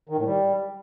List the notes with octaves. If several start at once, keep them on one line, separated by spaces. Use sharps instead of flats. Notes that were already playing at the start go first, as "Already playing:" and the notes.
D#3
A2
G3